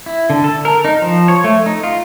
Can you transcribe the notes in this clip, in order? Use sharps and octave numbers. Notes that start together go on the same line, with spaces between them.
E4
D3
A4
A#4
D#4
F3
C#5
A3
D#4
F4